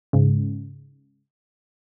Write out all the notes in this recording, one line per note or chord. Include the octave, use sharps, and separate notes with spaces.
G#2 C#3